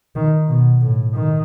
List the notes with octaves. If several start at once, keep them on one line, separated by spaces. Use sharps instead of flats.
D#3
B2
A2
D#3